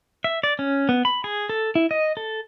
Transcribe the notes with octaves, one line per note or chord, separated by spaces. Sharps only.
E5
D5
C#4
B3
B5
G#4
A4
E4
D#5
A4